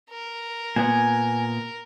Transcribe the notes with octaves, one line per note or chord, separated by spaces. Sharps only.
A#4
A#2 B3 G#5